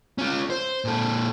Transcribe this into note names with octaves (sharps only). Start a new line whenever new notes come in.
C#4 F4
C5
A#2 A4